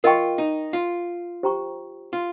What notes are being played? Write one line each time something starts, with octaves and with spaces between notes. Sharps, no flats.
F4 A#4 D#5 G5 C#6
D#4
F4
G4 C5 G5 A#5 C#6
F4